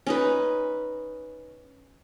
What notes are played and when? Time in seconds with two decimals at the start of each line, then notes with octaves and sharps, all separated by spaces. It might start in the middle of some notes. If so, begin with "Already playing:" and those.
0.07 C#4 D#4 B4